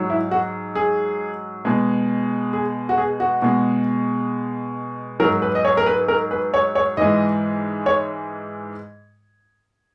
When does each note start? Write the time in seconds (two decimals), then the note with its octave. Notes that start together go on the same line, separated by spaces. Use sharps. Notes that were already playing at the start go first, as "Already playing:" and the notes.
Already playing: G#2 F#3
0.10 E4
0.31 F#4
0.75 G#4
1.65 B2 G#3
2.53 G#4
2.89 F#4
2.98 G#4
3.20 F#4
3.42 B2 G#3
5.20 F#3 A#4
5.24 G#2
5.42 B4
5.55 D#5
5.65 C#5
5.77 A#4
5.86 B4
6.08 A#4
6.31 B4
6.54 C#5
6.75 C#5
6.97 G#2 E3 G#3 D#5
7.86 C#5